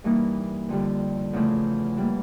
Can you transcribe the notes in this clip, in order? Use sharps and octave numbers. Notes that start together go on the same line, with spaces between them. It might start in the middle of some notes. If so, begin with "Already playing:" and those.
G2 E3 G3 A#3 D#4
F2 D3 G3
E2 C#3 F3 A3
E3 G3 A#3